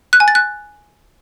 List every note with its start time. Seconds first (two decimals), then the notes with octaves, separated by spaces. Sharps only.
0.13 F#6
0.20 G#5
0.28 A6
0.35 F#6